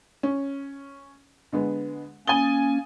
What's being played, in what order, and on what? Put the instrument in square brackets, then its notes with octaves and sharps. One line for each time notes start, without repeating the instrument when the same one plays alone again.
[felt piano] C#4
D3 G#3 B3
[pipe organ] A#3 C#4 [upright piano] G#5 G7 [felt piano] D#6 A6